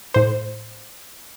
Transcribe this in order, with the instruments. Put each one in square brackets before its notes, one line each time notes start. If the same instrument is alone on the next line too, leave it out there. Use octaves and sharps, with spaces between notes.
[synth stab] A2 C5